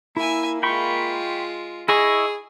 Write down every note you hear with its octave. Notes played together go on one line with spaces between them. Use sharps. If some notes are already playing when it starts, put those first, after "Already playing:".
A#3 E4 E5 G#5
G#3 F4 G5 B5 C#6
E4 G#4 D#5 C#6